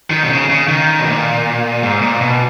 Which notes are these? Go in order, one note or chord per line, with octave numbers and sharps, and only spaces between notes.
D#3
B2
C#3
C#3
D#3
B2
A#2
G#2
A#2
B2